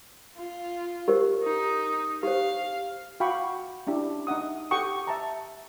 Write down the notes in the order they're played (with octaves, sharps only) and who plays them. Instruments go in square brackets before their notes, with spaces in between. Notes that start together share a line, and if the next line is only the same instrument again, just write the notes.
[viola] F4
[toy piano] G4 A#4 C5
[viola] D#4
[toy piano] G4 C5 [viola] F5
[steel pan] F#4 F5 G5 B5 C#6 D6
C#4 D4 E4 G4
D#4 E5 F#5 D#6
G4 A4 F#5 G5 C#6 D#6
E5 A5 A#5